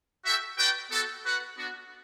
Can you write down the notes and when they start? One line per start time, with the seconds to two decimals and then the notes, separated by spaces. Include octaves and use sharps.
0.24 F#4 A4 E5 G5
0.57 F#4 B4 D5 G5
0.90 B3 F#4 A4
1.24 F#4 B4 F#5
1.56 B3 D4 F#4